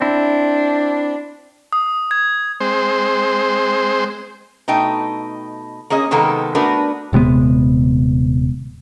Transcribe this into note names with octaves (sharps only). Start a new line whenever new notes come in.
C4 D4 E4
D#6
G#6
G#3 C4 C5
B2 A3 D#4 G5
A#3 C#4 G#4 D#5
C3 D#3 G#3 A#3 B3 A4
A3 B3 D4 F#4 A#4 B4
D#1 C3 G#3 B3